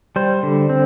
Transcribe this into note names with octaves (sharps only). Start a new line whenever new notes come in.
G3 C5
D3
C4